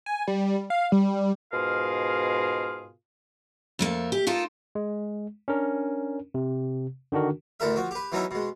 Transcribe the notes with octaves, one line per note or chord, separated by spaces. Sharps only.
G#5
G3
F5
G3
G#2 B2 F4 G#4 A#4 F5
F2 A3 A#3
G4
D#4 F4 A4 A#4
G#3
C#4 D4 A#4
C3
D3 D#3 D4 F#4 A#4
A1 D2 E3 A4 A#4 E5
F3 F#4
G4 B4
E3 F#3 B3 C#4 D#4 E4
B2 G#3